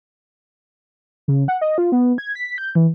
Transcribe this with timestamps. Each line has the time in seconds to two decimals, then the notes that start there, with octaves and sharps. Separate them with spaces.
1.28 C#3
1.48 F#5
1.61 D#5
1.78 F4
1.92 B3
2.18 G#6
2.35 B6
2.58 G6
2.75 E3